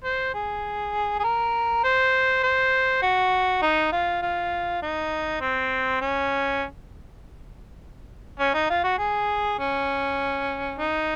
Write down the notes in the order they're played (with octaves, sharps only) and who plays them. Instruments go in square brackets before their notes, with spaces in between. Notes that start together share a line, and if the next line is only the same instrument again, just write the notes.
[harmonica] C5
G#4
G#4
A#4
C5
C5
F#4
D#4
F4
F4
D#4
C4
C#4
C#4
D#4
F4
F#4
G#4
C#4
D#4